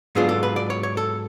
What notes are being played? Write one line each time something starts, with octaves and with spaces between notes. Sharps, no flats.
G#2 F#3 B3 D4 F4 G#4
A4
B4
D5
C#5
C#5
A4